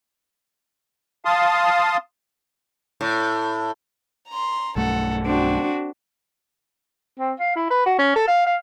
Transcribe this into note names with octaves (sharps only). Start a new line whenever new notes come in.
F5 A5 C6 D#6
A2
A#5 C6
B1 G2 A3 A4 F#5
C4 D4 F#4
C4
F5
E4
B4
F#4
C#4
A4
F5
F5